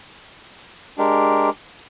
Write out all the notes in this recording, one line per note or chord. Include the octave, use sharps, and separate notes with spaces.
G#3 D4 G4 A#4